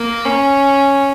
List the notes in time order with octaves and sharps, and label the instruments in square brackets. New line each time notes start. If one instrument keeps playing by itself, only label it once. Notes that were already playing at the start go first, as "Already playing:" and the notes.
Already playing: [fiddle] A#3
C#4